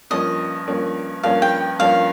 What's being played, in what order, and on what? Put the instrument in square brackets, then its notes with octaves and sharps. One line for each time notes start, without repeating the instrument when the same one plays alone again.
[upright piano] G2 F3 A#3 C#4 [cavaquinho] D#5
[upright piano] G2 F3 A#3 C#4
[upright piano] G2 F3 A#3 C#4 [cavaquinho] F5
[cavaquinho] G5
[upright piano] G2 F3 A#3 C#4 [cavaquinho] F5